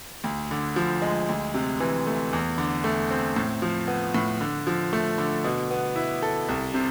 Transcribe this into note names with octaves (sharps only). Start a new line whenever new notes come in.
D2
D3
F3
G#3
D2
C3
E3
A3
E2
D3
A3
C4
A2
F3
B3
A2
D3
F3
A3
D3
B2
B3
E4
A4
C2
C3